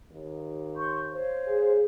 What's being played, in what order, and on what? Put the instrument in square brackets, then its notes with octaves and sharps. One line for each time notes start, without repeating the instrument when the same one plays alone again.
[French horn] D#2
[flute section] C6 C#6 G6
C5 C#5 F5
[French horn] G#4